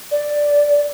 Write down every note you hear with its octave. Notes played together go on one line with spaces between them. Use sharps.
D5